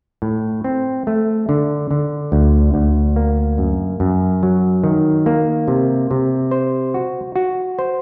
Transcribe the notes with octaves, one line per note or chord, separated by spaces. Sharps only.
A2
C4
A3
D3
D3
D2
D2
A#3
F#2
F#2
F#3
D#3
A#3
C3
C3
C5
F#4
F#4
C5